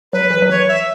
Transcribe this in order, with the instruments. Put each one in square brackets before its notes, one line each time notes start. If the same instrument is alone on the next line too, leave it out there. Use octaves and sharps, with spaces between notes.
[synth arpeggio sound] F#3 [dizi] B4
[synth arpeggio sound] E3
F#3
[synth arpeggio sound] E3 [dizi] C#5
[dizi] E5